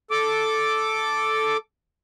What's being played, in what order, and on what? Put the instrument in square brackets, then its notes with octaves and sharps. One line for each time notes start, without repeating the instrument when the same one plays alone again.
[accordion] A4 D6